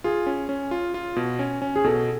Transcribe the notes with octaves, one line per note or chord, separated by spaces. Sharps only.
F4 G#4
C#4
C#4
F4
F4
B2
C#4
C#4
G#4
B2 A4